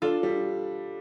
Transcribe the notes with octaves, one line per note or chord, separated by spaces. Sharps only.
D4 F4 A4
G3